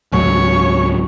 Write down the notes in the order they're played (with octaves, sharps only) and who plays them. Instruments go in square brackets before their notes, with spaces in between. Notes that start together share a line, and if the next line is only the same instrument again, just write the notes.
[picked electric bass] C#2 G#2 F#3 [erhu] C#5